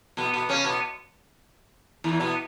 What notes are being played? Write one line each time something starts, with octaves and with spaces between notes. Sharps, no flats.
B2 B3
B2 B3
C#3 C#4
B2 B3
E2 E3
B2 B3